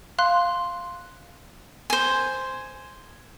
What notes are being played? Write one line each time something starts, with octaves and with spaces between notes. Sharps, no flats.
F5 C6 F#6
C5 G#5